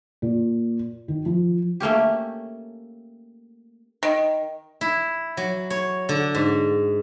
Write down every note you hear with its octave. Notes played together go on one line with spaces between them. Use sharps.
A#2
D#3
F3
A3 A#3 C#4 G4
D#3
E4
F#3
C#5
D3
G#2